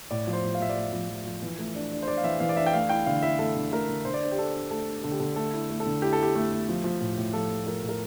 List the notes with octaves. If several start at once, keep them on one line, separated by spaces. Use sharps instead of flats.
A2 D5
F3
C5
F3
F5
F3 E5
D5
A3 E5
F3
F3
F3
E3
A3
D4
D4
C5
D4 D5
F5
E3 E5
E3 F5
D5
D4 E5
G5
A3 F5
E4 G5
D3 F5
E4 E5
A3 A4
D3
A3 A#4
D3
D3 C5
D5
D4 C5
G4
D4 A4
D4
A3 A4
D4
D3 A4
G4
D3 A4
A3 A4
E4
A3
A4
D3
E4 G4
A4
E4 G4
A3
A3
F3
F3
A2
A2
F3 A4
A3
F3 A#4
A2
A#4